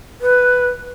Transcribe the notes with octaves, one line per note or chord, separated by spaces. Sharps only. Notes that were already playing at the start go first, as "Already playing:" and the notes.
B4